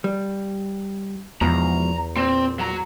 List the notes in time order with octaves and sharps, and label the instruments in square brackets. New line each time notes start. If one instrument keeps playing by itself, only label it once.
[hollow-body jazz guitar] G3
[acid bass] E2 [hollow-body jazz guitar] G#2 B2 F3 [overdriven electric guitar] A#5
[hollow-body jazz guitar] A#2 [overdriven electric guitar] C4
[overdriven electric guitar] F#3 A#5